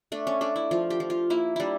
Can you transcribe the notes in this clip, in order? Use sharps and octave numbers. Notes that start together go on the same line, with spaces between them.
A3 D4
C#4
A3 D4
E4
F3 F4
G4
F3
F4
A#3 E4
G3 D4 E4